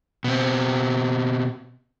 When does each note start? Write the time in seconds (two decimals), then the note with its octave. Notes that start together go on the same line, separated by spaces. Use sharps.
0.24 B2 C4